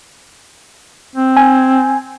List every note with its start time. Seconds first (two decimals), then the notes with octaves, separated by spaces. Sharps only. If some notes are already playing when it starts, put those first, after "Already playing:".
1.16 C4
1.37 G#5